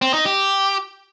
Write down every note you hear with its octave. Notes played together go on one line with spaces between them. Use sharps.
C4
D#4
G4